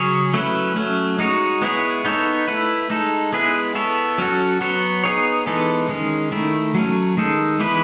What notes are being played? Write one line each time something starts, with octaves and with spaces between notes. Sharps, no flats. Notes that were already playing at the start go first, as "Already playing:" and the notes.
Already playing: C#3 F#3 C#4 G#4 C#5
F#3 A3 C#4 E4 B4
F#3 A3 C#4
G#3 D#4 F#4 C#5
G#3 B3 E4 G#4 C#5
B3 D#4 A4 C#5
A3 E4 B4
G#3 D#4 A4
G#3 B3 E4 G#4 B4
B3 E4 A4 C#5
F#3 C#4 F#4 A4
F#3 B3 F#4 C#5
B3 D#4 G#4 C#5
E3 G#3 B3 D#4 A4
D#3 G#3 C#4
D#3 A3 E4
F#3 A3 C#4
D#3 G#3 D#4 A4
E3 G#3 B3 E4 B4